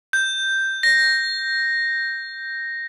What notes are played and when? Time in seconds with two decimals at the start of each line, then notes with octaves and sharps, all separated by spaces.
0.13 G6
0.83 A#6